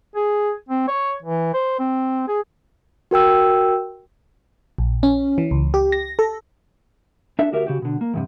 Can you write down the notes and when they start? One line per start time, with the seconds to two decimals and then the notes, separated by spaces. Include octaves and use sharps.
0.16 G#4
0.69 C4
0.88 C#5
1.23 E3
1.54 C5
1.79 C4
2.28 G#4
3.11 F#4 A#4 G5 E6
4.78 A#1
5.03 C#4
5.38 E3
5.51 C#2
5.74 G4
5.92 A#6
6.19 A4
7.39 D4 A4 E5
7.52 D2 F#4 G4 A#4 E5
7.67 C#3 F#4 G4
7.82 B2 D3
8.01 A#3
8.14 E2 G2 C3